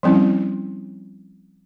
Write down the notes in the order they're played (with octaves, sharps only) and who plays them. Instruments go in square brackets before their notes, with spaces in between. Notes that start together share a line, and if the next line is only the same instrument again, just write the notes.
[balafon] F3 G3 C4 C#4 E4